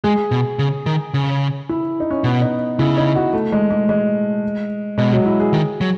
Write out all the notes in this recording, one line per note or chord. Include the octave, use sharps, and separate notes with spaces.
G#3 G#4
B2
C#3
D#3
C#3
E4
D#4
C#4
B2 B3
D#4
C#3 E4
D#4
F#4
A3
G#3
G#3
G#3
B2 G#3
F#3
E4
G#4
D#3
F#3